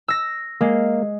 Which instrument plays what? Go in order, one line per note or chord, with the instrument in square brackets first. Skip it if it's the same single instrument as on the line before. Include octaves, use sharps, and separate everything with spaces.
[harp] E6 A#6
[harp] G#3 [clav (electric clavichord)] A#3